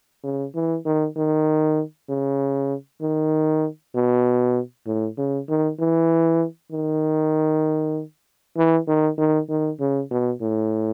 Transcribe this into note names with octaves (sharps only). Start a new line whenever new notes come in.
C#3
E3
D#3
D#3
C#3
D#3
B2
A2
C#3
D#3
E3
D#3
E3
D#3
D#3
D#3
C#3
B2
A2